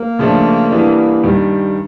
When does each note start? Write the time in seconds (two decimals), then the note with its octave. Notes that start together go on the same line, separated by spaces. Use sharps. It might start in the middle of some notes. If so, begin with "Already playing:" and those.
Already playing: A#3
0.19 C#3 F3 A3 D4
0.71 E3 G3 B3 D4
1.23 G2 D#3 G3